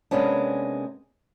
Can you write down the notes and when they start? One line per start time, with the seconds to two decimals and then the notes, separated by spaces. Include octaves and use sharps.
0.11 C3 G#3 A#3 B3 C#4 D4